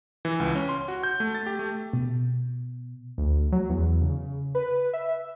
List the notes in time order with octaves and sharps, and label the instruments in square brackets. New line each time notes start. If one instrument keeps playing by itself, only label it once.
[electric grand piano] E3
C#2
C#4
C6
F#4
G6
A3
A6
G4
A3
[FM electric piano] B2
[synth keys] D2
F#3
E2
C#3
B4
E5